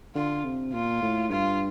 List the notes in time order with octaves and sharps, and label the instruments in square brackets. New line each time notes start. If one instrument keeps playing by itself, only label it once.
[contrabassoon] D3 [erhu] F4
[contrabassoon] C3
[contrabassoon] A#2 [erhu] F4
[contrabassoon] A2
[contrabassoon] G2 [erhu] F4